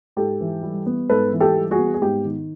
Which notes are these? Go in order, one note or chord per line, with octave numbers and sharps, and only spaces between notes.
G#2 G4 A4
E3
G3
B3
G#2 A4 B4
E3
G4 A4
G3
F#4 G#4
B3
G#4
G#2 G4
D#3